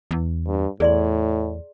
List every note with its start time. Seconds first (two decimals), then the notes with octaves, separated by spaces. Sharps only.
0.11 E2
0.47 G2
0.80 E2 A2 G#4 D5 C6